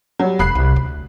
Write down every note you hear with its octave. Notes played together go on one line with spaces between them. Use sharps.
F#3 G3
E1 A#3 B5 F#6 C7
C2
D2